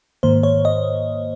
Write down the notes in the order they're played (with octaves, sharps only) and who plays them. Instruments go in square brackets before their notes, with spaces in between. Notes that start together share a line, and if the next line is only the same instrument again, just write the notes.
[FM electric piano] G#2 D#3 A#3 C5
C#5
D#5